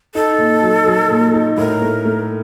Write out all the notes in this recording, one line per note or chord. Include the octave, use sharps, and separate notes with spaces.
D#4 A4
A#2
F#3
F#3
A#2
D#4
A2 A#4
A3
A3